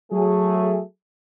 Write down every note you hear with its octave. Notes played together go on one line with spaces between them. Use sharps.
F#3 A3 G#4